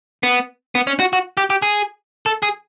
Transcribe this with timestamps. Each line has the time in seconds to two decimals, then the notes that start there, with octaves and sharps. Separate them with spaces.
0.23 B3
0.75 B3
0.87 C#4
1.00 F#4
1.13 F#4
1.37 G4
1.50 G4
1.62 G#4
2.26 A4
2.43 G#4